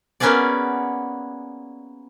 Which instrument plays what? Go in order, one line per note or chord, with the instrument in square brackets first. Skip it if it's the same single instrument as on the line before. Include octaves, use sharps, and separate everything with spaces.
[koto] A#3 B3 C#4 F#4 G#4 D5